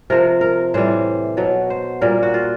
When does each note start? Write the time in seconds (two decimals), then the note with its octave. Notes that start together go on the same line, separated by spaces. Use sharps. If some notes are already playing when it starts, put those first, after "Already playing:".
0.10 C3 F3 A#4
0.41 A#4
0.74 A2 E3 G3 C5
1.37 B2 F#3
1.70 C5
2.01 A#2 G3 A#4
2.23 F#4
2.34 F4